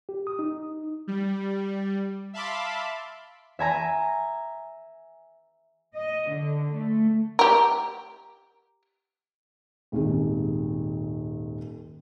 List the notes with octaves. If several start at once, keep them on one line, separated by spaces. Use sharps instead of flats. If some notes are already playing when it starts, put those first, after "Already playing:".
G4
D#6
D#4
G3
E5 F5 A5 B5 C6 D6
E5 G#5 A#5
D#5
D3
A3
G4 A#4
D#1 G#1 D#3 G#4